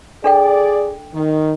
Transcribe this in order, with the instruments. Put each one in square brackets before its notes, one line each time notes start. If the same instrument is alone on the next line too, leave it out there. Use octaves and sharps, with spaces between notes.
[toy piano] D4 A4 G5 [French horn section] G#4 D5
[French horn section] D#3